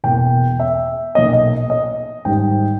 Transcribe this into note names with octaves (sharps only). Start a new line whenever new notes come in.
E1 E2 B2 A#3 G5
E5
B1 A#2 A#3 D#5
D#5
D#5
G#1 G#2 G3 G5